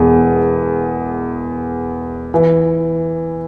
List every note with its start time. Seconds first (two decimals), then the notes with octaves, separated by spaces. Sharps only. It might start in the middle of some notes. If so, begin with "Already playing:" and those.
Already playing: E1 E2 G#3
2.34 E3